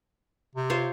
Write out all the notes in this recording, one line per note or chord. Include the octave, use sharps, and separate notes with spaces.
C3
F4 C5 C#5